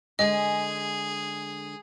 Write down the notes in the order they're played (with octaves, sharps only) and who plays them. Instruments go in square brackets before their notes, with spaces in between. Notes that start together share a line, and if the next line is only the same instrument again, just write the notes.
[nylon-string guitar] D3 G#3 G#5 [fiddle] G#4 [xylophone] D#5